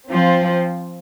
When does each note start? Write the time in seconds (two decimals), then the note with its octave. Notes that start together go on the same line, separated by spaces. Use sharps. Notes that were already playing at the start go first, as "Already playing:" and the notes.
0.10 F3 C4 F4 C5